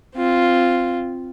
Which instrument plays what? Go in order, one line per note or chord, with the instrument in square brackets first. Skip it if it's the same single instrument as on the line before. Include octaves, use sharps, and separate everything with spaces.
[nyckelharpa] C4 F4